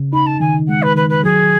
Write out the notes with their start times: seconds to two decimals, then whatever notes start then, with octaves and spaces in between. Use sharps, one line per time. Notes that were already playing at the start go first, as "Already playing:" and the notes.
Already playing: C#3
0.13 D#4 B5
0.26 A5
0.40 D#3 G#5
0.68 G#3 F#5
0.82 B4
0.96 D#3 B4
1.09 B4
1.24 F#3 G#4